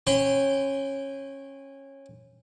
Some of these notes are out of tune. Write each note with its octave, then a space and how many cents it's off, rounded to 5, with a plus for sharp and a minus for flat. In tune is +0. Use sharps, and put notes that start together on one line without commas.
C#4 -20 G5 -10 C6 -40